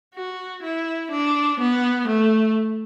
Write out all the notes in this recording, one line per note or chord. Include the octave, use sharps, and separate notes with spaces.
F#4
E4
D4
B3
A3